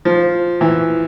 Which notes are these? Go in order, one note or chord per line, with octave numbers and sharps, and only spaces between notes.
F3
E3